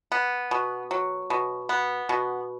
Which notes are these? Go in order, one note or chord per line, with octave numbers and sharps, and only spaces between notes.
B3
B2
F#3
B2
B3
B2